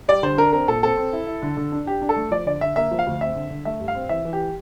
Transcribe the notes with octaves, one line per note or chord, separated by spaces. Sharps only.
G3 D5
D3 C5
D4 A#4
C4 A#4
A#2 A4
C4 A4
C4
E4
E4
D3
D3
D4
D4 G4
D4
A4
A3
F3 D5
D3 D5
D3 E5
A#3 E5
F3
F5
D2
C4 E5
D3
D3
A3 E5
G2
F5
C4
E3 E5
E3
G4